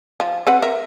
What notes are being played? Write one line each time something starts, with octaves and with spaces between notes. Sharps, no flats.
F3
C4 B4 F#5
A#4 E5